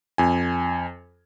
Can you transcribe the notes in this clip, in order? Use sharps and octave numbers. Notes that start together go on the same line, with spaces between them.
F2 G#5